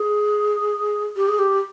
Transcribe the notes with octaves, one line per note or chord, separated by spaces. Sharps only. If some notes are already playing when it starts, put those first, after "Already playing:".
Already playing: G#4
G4
G#4
G4